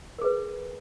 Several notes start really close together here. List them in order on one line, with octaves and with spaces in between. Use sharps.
A#4 G#4 B4